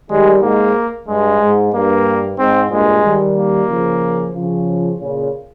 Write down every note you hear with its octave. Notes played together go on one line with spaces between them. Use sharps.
D#3 G3 G#3
G#2 A#3
G2 G#3
G#2
G2 A#3
G#2 C4
G2 A#2 G#3
D#3 G3
A#3
C#3 F3
C#3 F3
A#2 C#3